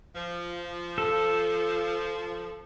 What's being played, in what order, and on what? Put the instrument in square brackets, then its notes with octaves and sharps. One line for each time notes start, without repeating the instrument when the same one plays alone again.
[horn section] F3
[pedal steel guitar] A4